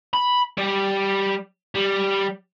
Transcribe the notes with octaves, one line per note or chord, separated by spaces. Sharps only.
B5
G3 G5
G3